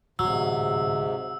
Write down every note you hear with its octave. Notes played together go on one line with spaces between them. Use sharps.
D1 G#2 C3 F#3 E6